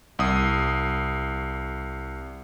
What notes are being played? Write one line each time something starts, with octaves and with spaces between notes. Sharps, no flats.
C2 D#6